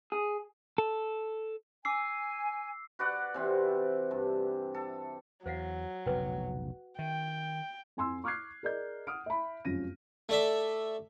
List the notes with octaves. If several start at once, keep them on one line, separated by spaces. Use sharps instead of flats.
G#4
A4
G#5 D6 E6 C7
F#4 B4 D5 F#5
C3 E3 C4
G2
A4
E2 F#3 C5 F5 F#5
F1 B1 C#3 B4 G5
D#3 E5 G5
F2 G#5 C6 E6
C#6 D6 F6 F#6 G#6 C7
G#4 A#4 D5 D#5 G6
F#5 D#6 F6 D7
E5 B5
F1 F#2 F3 C#4 A#6 D#7
A3 D5 E5